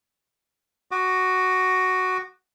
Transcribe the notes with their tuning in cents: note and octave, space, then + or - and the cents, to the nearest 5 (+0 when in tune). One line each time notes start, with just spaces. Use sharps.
F#4 +5 D6 +40